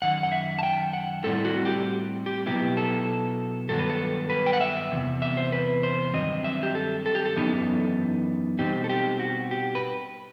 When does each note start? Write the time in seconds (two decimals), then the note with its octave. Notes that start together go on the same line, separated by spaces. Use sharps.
0.02 F#2 D#3 F#5
0.23 F#5
0.32 E5
0.59 A5
0.63 G5
0.93 F#5
1.23 A2 G3 C4 E4 A4
1.45 F#4
1.65 G4
2.26 G4
2.46 B2 F#3 B3 E4 G4
2.77 A4
3.69 G2 D#3 F#3 B3 A4
3.79 B4
3.90 A4
4.30 B4
4.46 G5
4.53 F#5
4.61 E5
4.91 E2 C3
5.22 E5
5.37 C5
5.52 B4
5.83 C5
6.14 G2 D#3 F#3 C4 D#5
6.44 E5
6.63 G4
6.75 A4
7.06 A4
7.15 G4
7.25 A4
7.36 F#2 E3 B3 D#4
8.59 B2 G3 C4 D#4 G4
8.84 A4
8.89 G4
9.19 F#4
9.51 G4
9.75 B4